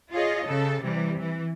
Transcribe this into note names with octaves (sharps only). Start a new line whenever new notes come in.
F4 G#4 C#5 D#5
C#3 A4
C3 E3 G3
E3